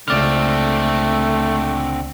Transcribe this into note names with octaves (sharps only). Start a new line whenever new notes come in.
C#2 D3 A3 C4 D5 F6